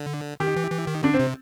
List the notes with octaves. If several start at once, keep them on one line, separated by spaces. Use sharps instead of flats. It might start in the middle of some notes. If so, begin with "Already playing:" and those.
Already playing: D3
D#3 G4
E3
E3
D#3
D3 D4
C4
C3